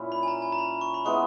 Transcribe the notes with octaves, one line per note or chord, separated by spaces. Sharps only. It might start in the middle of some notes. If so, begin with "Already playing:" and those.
Already playing: A#2 C#4 E4
B5
G#5
A#5
G#5
A#5
B5
C#6
B5
G#3 B3 E4 C#6